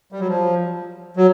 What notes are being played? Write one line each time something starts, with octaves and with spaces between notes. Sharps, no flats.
G3
F#3
F3
F#3